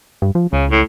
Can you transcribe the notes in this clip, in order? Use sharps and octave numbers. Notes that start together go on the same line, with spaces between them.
G2
F3
C#2 C#3
A2